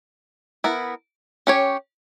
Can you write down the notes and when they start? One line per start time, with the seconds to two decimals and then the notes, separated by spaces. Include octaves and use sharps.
0.64 B3 E4 A#4
1.47 C#4 G4 C#5